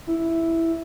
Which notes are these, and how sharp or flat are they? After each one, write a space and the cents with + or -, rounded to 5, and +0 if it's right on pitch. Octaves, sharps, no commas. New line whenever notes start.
E4 +0